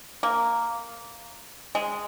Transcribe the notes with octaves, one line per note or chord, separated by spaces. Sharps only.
A#3
G#3